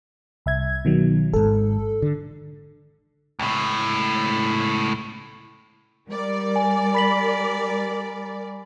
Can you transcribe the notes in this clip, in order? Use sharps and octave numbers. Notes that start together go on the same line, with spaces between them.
C2 E5 G#6
B2 D#3 F#3
G#1 G#2 A4
D3
C#2 A2
G3 A#4 D5
G#5
B5 B6 F#7